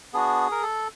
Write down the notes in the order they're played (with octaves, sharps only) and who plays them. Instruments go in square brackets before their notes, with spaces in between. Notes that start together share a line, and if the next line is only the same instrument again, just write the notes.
[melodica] B3 D4 F#4 G#4
A#4
A4